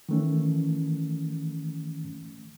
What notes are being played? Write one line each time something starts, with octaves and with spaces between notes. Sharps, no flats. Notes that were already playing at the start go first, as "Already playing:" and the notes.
D#3 E3 A3 C#4